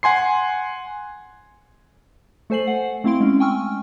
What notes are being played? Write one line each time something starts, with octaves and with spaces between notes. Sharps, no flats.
F#5 G#5 C6 C7
A3 A4 C5 G#5 C7 F#7
F#5
A3 C4 E4 F5 C6 D7
G#3 C#4
G5 G#5 C#6 E6 F6